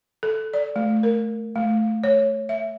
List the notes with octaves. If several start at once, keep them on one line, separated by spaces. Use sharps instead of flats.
A4
D5
A3
A#4
A3
C#5
E5